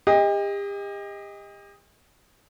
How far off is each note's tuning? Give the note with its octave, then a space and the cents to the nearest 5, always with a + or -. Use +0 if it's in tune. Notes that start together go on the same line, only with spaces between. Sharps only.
G4 +40 D#5 +10